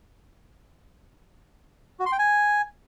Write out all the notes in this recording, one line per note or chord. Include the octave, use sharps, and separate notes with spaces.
F#4
C6
G5
G#5